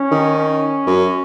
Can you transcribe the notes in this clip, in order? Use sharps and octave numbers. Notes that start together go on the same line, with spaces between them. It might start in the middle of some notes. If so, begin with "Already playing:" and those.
Already playing: C#4
D#3
C#4
F#2